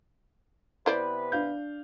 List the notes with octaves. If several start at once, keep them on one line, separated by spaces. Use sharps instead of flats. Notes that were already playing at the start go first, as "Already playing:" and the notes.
C3 B3 E4 B4 C5 D5
D4 F5 G6